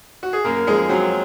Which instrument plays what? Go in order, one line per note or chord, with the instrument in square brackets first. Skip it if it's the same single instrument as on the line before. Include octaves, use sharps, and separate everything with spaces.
[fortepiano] F#4
G#4
F#2 A#3 A#4
F3 G#3 G#4
F#3 C4 F#4